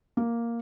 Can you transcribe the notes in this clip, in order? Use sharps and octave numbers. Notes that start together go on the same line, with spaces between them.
A#3